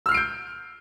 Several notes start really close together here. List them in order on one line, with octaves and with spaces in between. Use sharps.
E6 F6 C7 D7 G6